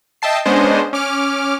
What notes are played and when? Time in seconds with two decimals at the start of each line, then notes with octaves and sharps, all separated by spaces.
0.22 D#5 E5 G5 A5 C7
0.45 G#3 B3 C#4 D4 C5 D#5
0.93 C#4 D6 F6